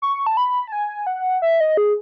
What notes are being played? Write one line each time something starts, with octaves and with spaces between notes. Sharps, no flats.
C#6
A5
B5
A5
G#5
F#5
E5
D#5
G#4